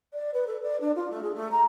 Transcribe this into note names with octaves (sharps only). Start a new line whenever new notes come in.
D5
B4
A4
D5
D4
F4
A3
G#4
A3
A#5